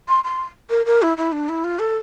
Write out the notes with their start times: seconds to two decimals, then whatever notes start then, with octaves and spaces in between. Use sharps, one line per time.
0.08 C6
0.24 C6
0.70 A#4
0.86 A#4
1.02 E4
1.17 E4
1.32 D4
1.49 E4
1.64 F4
1.79 A4